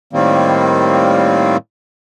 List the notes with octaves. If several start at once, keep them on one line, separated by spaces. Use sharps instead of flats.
A2 D#3 G3 A#3 C4